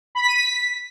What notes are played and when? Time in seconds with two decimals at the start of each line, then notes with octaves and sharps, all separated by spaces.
0.15 B5
0.21 B6
0.28 D#7
0.35 B6